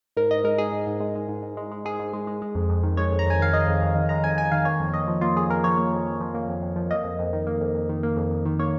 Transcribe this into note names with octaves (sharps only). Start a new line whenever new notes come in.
G#2 A#4
G#2 D#5
G#3 A#4
G#3 G#4
G#2
G#2
G#3
G#3
G#2
G#2
G#3
G#3
G#2 G#4
G#2
G#3
G#3
G#3
F2
F2
D#3
G#3 C#5
F2
A#5
F2 G#5
D#3 F5
G#3 D#5
F2
F2
D#3
G#3 A#5
F2 G#5
F2 G#5
D#3 F5
A#3 C#5
F2
F2 D#5
F3
A#3 F4
F2 G#4
F2 A#4
F3 C#5
A#3
F2
F2
F3
A#3
F2
F2
F3
A#3 D#5
F2
F2
D#3
A#3
F2
F2
D#3
A#3
F2
F2
D#3
A#3 C#5